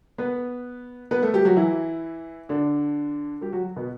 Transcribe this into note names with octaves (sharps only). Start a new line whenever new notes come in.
B3 B4
B3 B4
A3 A4
G3 G4
F#3 F#4
E3 E4
D3 D4
G3 G4
F#3 F#4
B2 B3